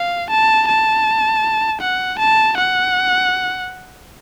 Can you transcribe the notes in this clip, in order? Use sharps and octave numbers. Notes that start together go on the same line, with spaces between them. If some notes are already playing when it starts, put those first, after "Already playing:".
Already playing: F5
A5
A5
F#5
A5
F#5